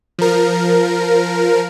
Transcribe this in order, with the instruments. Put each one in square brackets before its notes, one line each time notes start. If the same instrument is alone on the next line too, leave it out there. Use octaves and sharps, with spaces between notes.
[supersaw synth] F3 A#4